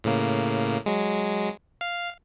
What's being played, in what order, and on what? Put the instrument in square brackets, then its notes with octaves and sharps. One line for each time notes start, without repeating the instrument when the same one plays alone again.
[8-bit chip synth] A2 C#3 A#3
F#3 G#3
F5